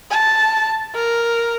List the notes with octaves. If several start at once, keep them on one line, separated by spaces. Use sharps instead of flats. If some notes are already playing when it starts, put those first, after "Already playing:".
A5
A#4